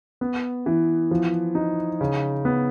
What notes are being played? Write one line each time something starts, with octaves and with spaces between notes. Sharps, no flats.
B3
E3
F3
D#4
C#3
B3